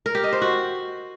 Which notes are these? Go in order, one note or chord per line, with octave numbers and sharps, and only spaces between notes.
A#4
G4
D#5
C5
F#4